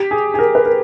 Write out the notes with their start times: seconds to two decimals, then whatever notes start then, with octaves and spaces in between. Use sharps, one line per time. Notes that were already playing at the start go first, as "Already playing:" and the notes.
Already playing: G4
0.11 G#4
0.34 G#4
0.39 A#4
0.55 B4
0.66 A#4